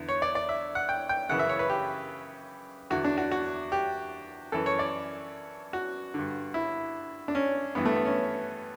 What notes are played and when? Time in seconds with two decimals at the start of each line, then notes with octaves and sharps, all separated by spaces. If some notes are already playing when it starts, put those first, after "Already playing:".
Already playing: E2 D3
0.09 C#5
0.22 D5
0.35 D5
0.49 E5
0.75 F#5
0.89 G5
1.09 G5
1.29 F#2 C#3 E3 F#5
1.39 E5
1.49 C#5
1.59 B4
1.69 G4
2.90 E2 D3 F#4
3.04 D4
3.18 F#4
3.31 F#4
3.72 G4
4.52 F#2 E3 A4
4.66 C#5
4.79 D5
5.73 F#4
6.14 G2 D3
6.54 E4
7.28 D4
7.35 C#4
7.75 G2 E3 B3
7.86 A3
7.95 B3
8.05 C#4